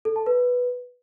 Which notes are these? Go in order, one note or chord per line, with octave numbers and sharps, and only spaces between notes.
A4
A5
B4